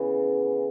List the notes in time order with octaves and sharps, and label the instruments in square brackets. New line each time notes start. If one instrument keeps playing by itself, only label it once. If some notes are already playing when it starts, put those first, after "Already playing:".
Already playing: [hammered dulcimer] C#3 E3 B3